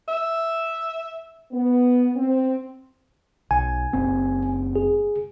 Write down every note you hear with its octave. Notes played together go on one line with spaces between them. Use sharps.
E5
B3
C4
B1 G#5
F#1 C4
G#4